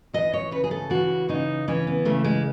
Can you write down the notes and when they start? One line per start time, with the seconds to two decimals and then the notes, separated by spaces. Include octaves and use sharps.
0.13 E3 D#5
0.33 C#5
0.51 C#3 B4
0.64 G#4
0.71 A4
0.90 E3 F#4
1.29 C#3 D#4
1.68 E3 C#4
1.87 B3
2.05 C#3 A3
2.25 G#3